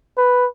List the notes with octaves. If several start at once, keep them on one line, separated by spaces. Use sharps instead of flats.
B4